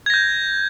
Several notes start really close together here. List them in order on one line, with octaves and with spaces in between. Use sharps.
G#6 A#6 G6